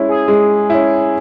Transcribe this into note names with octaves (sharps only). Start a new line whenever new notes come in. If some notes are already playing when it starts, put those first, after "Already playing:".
Already playing: G#3 C#4 E4
G#4
G#3
C#4 E4